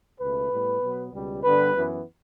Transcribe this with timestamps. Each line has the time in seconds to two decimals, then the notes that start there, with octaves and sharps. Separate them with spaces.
0.20 C#2 B2 A3 B4
0.51 A2 G3 B3
0.82 B2 F#3 B3
1.12 C#2 B2 G3
1.43 G2 D3 G3 B3 B4
1.74 F#2 E3 B3